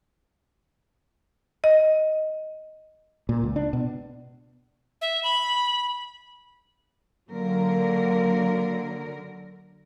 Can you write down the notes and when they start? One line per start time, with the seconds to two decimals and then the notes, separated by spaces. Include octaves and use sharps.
1.64 D#5
3.29 A#2
3.44 C#2
3.56 D4
3.73 B2
5.01 E5
5.23 B5
7.31 D3 F#3 A#3 A#4